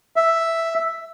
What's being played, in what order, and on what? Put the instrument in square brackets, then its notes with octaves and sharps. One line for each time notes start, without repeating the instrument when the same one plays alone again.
[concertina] E5